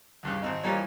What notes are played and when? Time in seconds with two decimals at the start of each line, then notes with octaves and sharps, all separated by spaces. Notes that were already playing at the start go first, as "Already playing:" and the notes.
0.23 C#2 G2 C#3
0.42 G#1 C4 D#4
0.63 E3 F3 G3 A#3 D#4 C#5